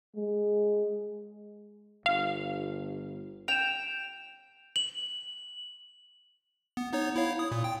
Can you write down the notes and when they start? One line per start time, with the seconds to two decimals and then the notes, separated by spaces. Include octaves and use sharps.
0.16 G#3
2.06 G1 F5
3.48 G5 E7 F7
4.76 F#7
6.77 B3
6.92 B3 D#4 C#5
7.16 E4 C#5 F5
7.39 D#6
7.51 A#2
7.64 G5